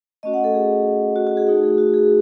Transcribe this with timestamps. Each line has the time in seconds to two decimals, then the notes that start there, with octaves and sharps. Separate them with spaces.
0.23 A3 C#4 F#4 D#5
0.34 F#5
0.44 A4
0.54 G#4
1.16 F#4
1.27 F#4
1.37 G#4
1.47 A3 D#4 F#4
1.63 G#4
1.78 F#4
1.94 G#4